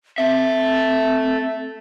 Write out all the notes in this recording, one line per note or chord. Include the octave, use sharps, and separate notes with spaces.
C4 A4 E5